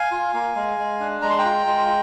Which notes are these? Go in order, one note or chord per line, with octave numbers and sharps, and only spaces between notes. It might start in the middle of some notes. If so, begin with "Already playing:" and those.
Already playing: F5 G#5
F4
A#3
G#3
G#3
D4
G#3 A#5
C6
G5 A#5
F4
G#3